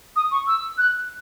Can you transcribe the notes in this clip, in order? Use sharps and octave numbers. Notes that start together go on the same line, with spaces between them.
D#6
C#6
E6
F#6